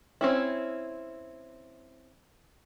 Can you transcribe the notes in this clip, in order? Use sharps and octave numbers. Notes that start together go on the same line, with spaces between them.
C4 C#4 E4